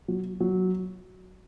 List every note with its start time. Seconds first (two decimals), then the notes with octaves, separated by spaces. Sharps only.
0.08 F#3
0.40 F#3